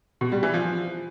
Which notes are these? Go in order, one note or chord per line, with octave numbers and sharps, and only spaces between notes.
B2
G3
E3
F3